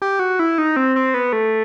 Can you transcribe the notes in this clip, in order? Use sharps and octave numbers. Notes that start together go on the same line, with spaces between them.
G4
F#4
E4
D#4
C4
C4
B3
A3